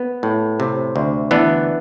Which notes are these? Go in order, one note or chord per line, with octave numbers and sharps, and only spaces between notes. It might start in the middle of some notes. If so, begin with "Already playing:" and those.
Already playing: B3
A2
C3
D2
E3 B3 D4